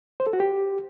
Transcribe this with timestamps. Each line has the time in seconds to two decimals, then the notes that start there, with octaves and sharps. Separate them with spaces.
0.20 C5
0.27 A4
0.33 F#4
0.40 G4